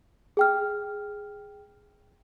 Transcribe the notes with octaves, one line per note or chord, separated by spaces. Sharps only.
G#4 G5 F6